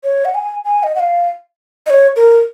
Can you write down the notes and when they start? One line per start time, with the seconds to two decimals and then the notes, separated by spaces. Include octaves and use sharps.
0.04 C#5
0.25 F#5
0.35 G#5
0.65 G#5
0.83 D#5
0.95 F#5
1.00 F5
1.86 D#5
1.90 C#5
2.16 A#4